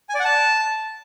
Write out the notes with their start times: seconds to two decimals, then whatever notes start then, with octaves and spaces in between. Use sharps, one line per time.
0.09 G#5
0.14 D5
0.20 F#5
0.25 A5